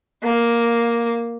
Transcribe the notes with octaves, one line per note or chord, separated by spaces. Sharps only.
A#3